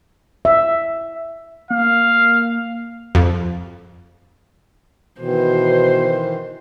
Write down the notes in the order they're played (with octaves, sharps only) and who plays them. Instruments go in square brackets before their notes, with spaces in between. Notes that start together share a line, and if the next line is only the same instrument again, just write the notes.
[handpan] E5
[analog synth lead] A#3 [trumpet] F5
[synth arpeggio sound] F2
[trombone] B2 [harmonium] D#3 E3 [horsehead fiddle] C5